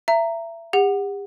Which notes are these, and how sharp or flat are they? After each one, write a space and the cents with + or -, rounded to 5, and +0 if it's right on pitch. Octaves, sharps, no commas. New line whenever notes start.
E5 +25 A#5 -10
G4 +40 F#5 +0